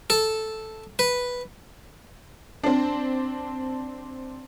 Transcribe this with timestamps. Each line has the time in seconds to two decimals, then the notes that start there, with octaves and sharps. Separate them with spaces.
0.10 A4
0.99 B4
2.64 C4 D4